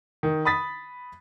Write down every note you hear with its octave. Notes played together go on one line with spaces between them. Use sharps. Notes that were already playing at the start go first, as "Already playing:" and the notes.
D#3
B5 D#6 A6 B6